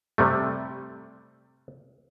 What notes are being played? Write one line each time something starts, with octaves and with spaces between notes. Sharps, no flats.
C3 G3 A3